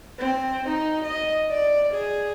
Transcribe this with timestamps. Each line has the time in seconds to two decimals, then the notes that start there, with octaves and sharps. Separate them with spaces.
0.19 C4
0.69 D#4
1.05 D#5
1.50 D5
1.94 G#4